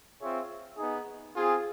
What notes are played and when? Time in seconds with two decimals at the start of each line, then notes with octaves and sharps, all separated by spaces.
0.20 C4 F4 G#4 C#5 E5
0.77 B3 D#4 G#4
1.35 C4 F4 G#4